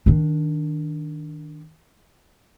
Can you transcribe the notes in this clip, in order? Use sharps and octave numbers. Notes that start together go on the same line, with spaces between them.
D#3 D4